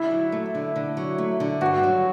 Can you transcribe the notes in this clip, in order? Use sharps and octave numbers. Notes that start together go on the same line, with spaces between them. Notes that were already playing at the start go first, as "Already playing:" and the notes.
Already playing: D3 E4
F#3
A3
D3
D3
F#3
A3
D3
G2 F#4
F#3